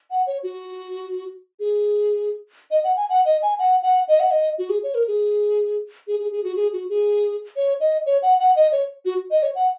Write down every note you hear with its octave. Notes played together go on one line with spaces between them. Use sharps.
F#5
C#5
F#4
G#4
D#5
F#5
G#5
F#5
D#5
G#5
F#5
F#5
D#5
F#5
D#5
F#4
G#4
C#5
A#4
G#4
G#4
G#4
G#4
F#4
G#4
F#4
G#4
C#5
D#5
C#5
F#5
F#5
D#5
C#5
F#4
D#5
C#5
F#5